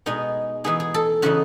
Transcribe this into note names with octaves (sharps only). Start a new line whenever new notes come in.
B2 G#3 B3 D#4 G#4
E3 B3 D#4 G#4
G#4
A4
C#3 E3 B3 D#4 F#4